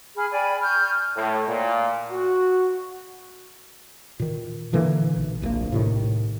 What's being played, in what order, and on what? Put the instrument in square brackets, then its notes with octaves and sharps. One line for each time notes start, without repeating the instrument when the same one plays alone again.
[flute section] G#4 B5 F6
D5 G5 G#5 B5
C#6 F6 G6
[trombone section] A2
A#2
F#4
[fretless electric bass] A#2 D#3
A#2 D3 E3 A#3
B1
D1 A#1 C3 A#3
A2 C3 D#3